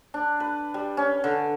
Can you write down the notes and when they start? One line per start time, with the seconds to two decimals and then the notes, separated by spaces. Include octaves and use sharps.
0.14 D4
0.40 B4
0.74 G3
0.97 C#4
1.24 D3